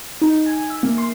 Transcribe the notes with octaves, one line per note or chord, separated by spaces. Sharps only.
D#4
G#5
E5
A#3
C6